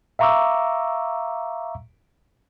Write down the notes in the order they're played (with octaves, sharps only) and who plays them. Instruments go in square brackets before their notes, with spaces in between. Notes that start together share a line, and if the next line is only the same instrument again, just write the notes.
[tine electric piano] E5 F5 A#5 C#6 D6 E6